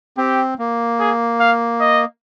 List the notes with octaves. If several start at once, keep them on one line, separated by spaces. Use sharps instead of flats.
C4 G4
A#3
G#4
F5
D#5